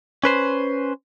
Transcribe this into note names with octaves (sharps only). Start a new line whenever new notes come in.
C#4 B4 C5